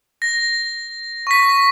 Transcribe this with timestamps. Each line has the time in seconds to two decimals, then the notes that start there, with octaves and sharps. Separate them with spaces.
0.22 A#6
1.27 C#6 B6